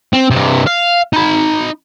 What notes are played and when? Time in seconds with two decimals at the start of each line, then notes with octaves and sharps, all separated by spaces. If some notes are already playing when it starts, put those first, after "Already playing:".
0.13 C4
0.31 G2 C3
0.67 F5
1.13 D#4 B5